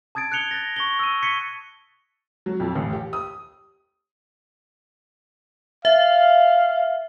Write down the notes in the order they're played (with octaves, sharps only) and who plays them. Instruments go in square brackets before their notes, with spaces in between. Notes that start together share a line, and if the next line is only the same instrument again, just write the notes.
[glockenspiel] A5 D#6 G#6 A6 D7
F#6 G#6 C#7 F7 G7
A6 A#6
C#6 A#6 G7
E6 D#7
C#6 G#6 B6 C#7 G7
[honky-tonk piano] F#3
F2
A1
G4
D#6
[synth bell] E5 [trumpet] F5